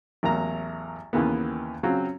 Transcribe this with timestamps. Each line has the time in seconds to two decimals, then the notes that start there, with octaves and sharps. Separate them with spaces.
0.23 A1 E2 F#3 A#3 A#5
1.13 D#2 C#3 E3 A#3 B3
1.83 C#3 F#3 C4 C#4 F4 F#4